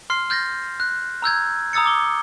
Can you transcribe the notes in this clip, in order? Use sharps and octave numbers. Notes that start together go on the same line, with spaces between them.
C6 F6 C7
F6 G6 A6 A#6
F#6
A#5 E6 G6 G#6
A#5 D#6 E6 A6 C#7
D6 G7